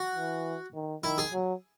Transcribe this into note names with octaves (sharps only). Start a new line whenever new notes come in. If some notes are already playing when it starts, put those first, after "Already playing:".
Already playing: F#4
E3
D#3
D#3 E4
G#4
F#3